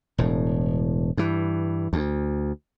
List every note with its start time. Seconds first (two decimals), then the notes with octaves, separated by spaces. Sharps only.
0.18 E1 A2
1.17 G2 E3
1.93 D2